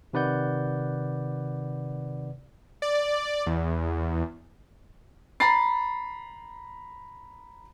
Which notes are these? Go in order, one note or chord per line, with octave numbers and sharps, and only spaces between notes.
C3 D#3 B4 D5 F#5 G6
D5
E2
A#5 B5 A6 C7